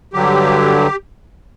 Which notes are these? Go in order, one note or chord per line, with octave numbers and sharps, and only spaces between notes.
G2 D3 F#3 G4